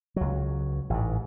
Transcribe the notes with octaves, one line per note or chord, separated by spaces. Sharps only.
C#2 F#3
A1 G#2